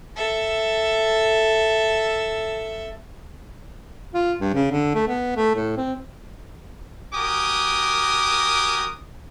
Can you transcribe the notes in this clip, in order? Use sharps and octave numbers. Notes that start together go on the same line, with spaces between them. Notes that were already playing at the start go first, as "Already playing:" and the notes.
A4 E5
F4
G2
C#3
D3
A3
B3
A3
A2
C4
F#4 G4 A#4 G#5 D6 D#6